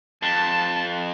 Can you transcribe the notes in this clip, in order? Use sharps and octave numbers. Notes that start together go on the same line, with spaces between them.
F2 A5